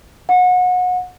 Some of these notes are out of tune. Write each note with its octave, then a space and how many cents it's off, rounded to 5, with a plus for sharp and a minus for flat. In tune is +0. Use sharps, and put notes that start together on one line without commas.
F#5 -30